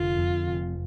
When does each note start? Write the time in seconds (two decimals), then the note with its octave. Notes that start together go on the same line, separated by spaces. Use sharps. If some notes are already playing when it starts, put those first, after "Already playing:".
Already playing: F1 D3 F4
0.18 F2
0.48 F1